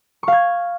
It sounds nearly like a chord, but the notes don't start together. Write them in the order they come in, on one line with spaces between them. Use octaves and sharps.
C#6 F5 G#6